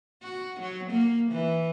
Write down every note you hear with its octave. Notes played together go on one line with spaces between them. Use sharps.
F#4
F#3
A#3
E3